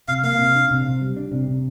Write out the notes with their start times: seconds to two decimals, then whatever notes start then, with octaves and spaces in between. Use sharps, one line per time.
0.08 C3 F5
0.24 A#3 F5
0.39 C3
0.55 D4
0.71 C3
0.86 C3
1.01 G3
1.16 D4
1.31 C3
1.48 C3